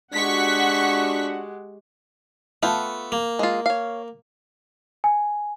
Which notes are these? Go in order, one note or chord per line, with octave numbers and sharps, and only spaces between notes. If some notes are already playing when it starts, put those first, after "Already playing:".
G#3 D4 F#4 G4 F#5 C#6 B6
A3 B3 F4 G5
A#3
G#3 F4
C#5 F5
G#5